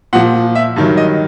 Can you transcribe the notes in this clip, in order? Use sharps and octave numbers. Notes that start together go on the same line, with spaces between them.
A#2 F3 F#5
E5
G2 D#3 F#3
D#5